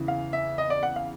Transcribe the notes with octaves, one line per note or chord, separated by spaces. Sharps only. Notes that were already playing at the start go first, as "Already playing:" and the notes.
Already playing: E2 C#3 E3
F5
E5
D#5
D5
F#5
F5